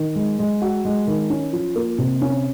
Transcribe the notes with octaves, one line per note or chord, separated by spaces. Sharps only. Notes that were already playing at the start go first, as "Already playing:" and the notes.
Already playing: D#3
G#3
G#3
F#4
G#3
D#3
C#4
F3
A#3
C3
C#4